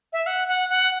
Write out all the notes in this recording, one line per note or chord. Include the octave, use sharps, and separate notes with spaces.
E5
F#5
F#5
F#5